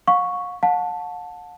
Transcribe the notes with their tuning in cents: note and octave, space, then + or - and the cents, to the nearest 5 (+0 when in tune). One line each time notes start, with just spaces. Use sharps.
F5 +45 C#6 +0
F#5 -40 A5 +0